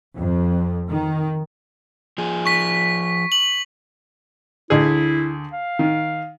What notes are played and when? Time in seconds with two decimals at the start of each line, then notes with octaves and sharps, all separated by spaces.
0.17 F2
0.89 D#3
2.18 F3 G#4
2.46 C#6 B6
3.32 F#7
4.70 D2 E4 G#4
5.52 F5
5.79 D#3